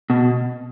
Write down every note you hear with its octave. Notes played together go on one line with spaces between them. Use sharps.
B2